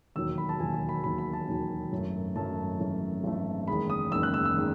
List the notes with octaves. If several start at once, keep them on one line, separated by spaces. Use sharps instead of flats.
E1 D#2 D#3 F#3 E6
B5
A5
E1 D#2 D#3 F#3 G#5
A5
B5
E1 D#2 D#3 F#3 B5
B5
A5
E1 D#2 D#3 F#3
G#1 F#2 E3 A3
G#1 F#2 E3 A3 A5
G#1 F#2 E3 A3
G#1 F#2 E3 A3
F#1 E2 D#3 G#3 B5
D#6
F#1 E2 D#3 G#3 E6
F#6
E6
E6
D#3 G#3